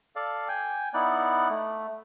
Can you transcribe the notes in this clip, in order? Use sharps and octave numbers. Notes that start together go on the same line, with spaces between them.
A4 D5 F5
G5 G#5
B3 D#4 E4 D5 F#6
A3